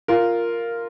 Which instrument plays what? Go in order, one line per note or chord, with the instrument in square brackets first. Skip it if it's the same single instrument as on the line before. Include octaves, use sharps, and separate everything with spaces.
[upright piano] F4 A#4